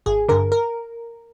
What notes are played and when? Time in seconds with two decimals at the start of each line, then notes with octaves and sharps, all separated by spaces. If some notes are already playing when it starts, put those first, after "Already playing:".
0.06 G#1 G#4
0.29 G2 D3 A#4
0.52 A#4